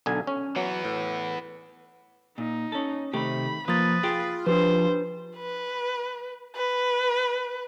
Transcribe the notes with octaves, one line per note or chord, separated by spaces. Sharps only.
B1 D3 G#5
C#4
E3 F#3 B3
A2
A#2 D#4
C#4 A4
C3 D#3 A3 G4 B5
F3 A#3 B4 D#6 A6
F4 G#4 G5
F3 D4 G4 B4 C5
B4
B4